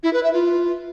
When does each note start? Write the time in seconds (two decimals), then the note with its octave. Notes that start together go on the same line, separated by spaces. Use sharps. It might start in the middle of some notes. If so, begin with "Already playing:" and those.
0.03 E4
0.13 B4
0.23 E5
0.33 F4